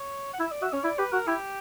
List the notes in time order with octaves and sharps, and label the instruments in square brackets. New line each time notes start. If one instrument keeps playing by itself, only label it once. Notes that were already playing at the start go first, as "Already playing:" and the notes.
Already playing: [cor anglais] C#5
F#5
[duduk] E4 [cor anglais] E5
[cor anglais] D5
[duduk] F#4 [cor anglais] E5
[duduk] C#4 [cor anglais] C#5
[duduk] E4 [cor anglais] D5
[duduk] G4 [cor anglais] B4
[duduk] F#4 [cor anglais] A#4
[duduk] E4 [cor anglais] G4